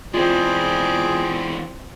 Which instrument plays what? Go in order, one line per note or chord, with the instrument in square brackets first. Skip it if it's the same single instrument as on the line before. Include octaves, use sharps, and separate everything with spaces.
[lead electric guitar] E3 G#3 [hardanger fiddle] C4 D5 [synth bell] F4 [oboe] G#4